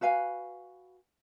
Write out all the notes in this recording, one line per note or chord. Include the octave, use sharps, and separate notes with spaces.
F#4 B4 F5 G#5